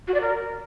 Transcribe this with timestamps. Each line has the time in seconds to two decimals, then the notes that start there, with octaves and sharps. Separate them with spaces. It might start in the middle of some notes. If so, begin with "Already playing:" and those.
0.07 F#4
0.14 D5
0.21 A#4